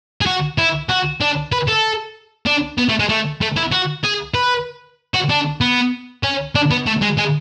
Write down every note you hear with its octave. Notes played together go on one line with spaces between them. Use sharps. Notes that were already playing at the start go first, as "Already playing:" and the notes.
G#4
F#4
E4
F#4
D4
B4
A4
D4
B3
A3
G#3
A3
A3
E4
F#4
G#4
B4
F#4
D4
B3
C#4
D4
B3
A3
G#3
G#3